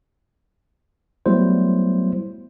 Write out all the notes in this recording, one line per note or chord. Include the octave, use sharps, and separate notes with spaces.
F#3 G3 A3 B3 E4 C5